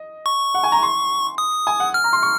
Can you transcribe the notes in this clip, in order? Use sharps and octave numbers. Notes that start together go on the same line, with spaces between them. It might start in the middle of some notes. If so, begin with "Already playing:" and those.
Already playing: D#5
C#6
F#5
G#5
A#5
C6
D#6
G#5
F#5
F6
A#5
C6
C#6